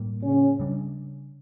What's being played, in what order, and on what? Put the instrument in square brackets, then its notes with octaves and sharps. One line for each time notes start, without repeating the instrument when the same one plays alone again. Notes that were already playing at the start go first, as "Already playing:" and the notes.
Already playing: [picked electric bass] A2 G3 A#3
[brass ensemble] C#3 C#4
[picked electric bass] C#3 G3 D4